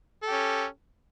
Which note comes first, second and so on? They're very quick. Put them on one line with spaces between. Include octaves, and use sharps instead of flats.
A4 G4 C#4